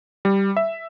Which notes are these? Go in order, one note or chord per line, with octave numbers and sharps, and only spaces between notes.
G3
E5